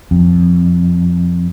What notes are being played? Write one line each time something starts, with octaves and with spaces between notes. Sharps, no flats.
F2